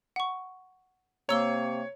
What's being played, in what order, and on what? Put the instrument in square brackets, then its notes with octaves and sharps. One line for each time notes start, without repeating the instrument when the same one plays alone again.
[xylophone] F#5 C#6
[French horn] C3 [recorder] A#3 [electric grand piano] C#5 [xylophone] A#5 E6 G7